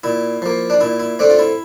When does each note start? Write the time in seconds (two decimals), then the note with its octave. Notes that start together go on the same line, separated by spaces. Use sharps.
0.04 A#2 E4
0.42 F3 A#3
0.70 D4
0.81 A#2 E4
1.00 E4
1.19 A3 C4 D4
1.30 F4
1.39 E4